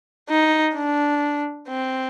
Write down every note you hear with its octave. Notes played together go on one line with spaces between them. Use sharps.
D#4
D4
C4